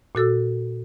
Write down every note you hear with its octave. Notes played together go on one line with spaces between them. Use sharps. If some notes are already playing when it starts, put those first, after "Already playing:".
A#2 F#4 A4 E6